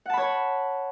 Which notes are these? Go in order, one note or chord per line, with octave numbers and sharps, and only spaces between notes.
C#5 F#5 A5 B5